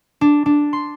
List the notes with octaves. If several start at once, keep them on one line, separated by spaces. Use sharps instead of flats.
D4
D4
C6